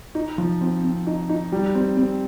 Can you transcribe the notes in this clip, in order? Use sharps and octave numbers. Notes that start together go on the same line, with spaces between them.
D#4
F3
C4
C4
D#4
D#4
G3
C4
C4